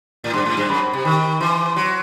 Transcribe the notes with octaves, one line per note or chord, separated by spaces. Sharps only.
A2
G2 C6
A2
G2
F#2 B5
C3
D#3 B5
E3 C6
C6
F#3